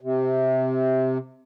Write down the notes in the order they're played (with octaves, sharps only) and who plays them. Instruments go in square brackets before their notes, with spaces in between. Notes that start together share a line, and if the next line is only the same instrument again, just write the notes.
[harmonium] C3